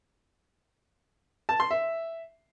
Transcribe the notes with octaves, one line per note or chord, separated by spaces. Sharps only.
A5
C6
E5